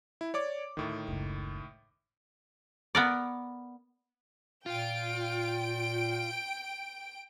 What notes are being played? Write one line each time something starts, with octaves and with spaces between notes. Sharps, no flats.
E4
C#5 D5 D6
D2 A2 D#3
F#1 C#2
B3 A#4 D5
A#2 F4 G5 D7